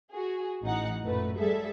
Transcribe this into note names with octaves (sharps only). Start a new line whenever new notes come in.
F#4 G#4
A1 E3 D#4 F#5
F#2 A#2 A3 B4
G3 G#3 G#4 A4 E5